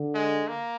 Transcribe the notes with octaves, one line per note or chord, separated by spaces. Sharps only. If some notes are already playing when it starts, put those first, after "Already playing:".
Already playing: D3
G#3
A#3